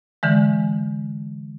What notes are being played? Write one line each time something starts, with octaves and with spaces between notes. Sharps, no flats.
D3 E3 G#3